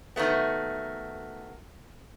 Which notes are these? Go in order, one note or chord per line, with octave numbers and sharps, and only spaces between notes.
D#3 F#3 A3 B3